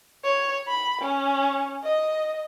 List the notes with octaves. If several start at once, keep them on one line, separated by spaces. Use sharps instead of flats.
C#5
B5
C#4
D#5